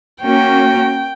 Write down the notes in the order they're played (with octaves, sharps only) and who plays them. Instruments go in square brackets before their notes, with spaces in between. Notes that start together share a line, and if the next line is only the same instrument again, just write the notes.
[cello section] A#3 C#4 F#4 [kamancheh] G5